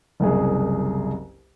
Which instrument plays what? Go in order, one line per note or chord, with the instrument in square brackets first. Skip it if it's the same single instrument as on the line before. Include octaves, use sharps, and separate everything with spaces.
[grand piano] F#1 C2 G#4